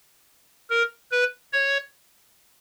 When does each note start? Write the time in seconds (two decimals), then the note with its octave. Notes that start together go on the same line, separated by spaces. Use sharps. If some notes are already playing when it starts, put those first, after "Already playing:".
0.70 A#4
1.11 B4
1.53 C#5